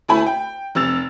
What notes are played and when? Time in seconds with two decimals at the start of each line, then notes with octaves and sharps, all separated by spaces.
0.08 D2 A3 E4 G#5 B5
0.26 G5
0.75 F1 C3 E6 A6 F7